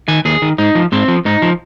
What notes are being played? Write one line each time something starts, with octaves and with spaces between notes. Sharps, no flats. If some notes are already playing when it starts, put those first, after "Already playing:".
D#3 G#5
D#2 G#4
D#3
G#2 D#4
F3
G#2 C4
F3
G#2 D#4
F3